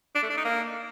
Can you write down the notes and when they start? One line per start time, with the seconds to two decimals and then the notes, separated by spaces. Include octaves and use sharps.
0.15 D4
0.23 A3
0.30 D4
0.37 D#4
0.45 A#3